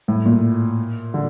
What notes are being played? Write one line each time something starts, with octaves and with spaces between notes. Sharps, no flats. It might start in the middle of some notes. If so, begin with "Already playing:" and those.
A2
A#2
D3